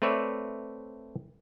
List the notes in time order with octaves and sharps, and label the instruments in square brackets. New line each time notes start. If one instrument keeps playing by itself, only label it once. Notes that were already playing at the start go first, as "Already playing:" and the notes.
[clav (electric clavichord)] A3 C4 B4 C#5 D5 E5